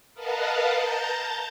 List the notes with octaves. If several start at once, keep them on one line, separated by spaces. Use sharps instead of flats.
A#4 B4 D#5 F5 F#5 A5
A5 A#5 G6 A6